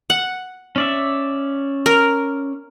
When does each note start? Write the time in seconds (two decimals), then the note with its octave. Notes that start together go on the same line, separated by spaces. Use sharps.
0.10 F#5
0.76 C#4 D5 E5
1.86 A#4